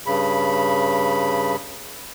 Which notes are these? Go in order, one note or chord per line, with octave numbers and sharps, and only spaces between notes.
G2 C#3 B5